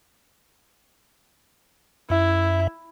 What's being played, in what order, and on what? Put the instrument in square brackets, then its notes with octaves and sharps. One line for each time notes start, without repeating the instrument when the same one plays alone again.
[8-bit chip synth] F#2 E5 [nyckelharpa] E4